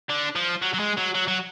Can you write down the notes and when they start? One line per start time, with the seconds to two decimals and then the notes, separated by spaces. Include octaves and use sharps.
0.10 D3
0.36 F3
0.62 F#3
0.74 F#3
0.80 G#3
0.97 F#3
1.14 F#3
1.28 F#3